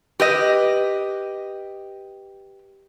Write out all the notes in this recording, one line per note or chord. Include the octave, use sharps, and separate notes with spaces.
G4 B4 D#5